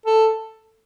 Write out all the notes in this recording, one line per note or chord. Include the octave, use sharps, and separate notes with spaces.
A4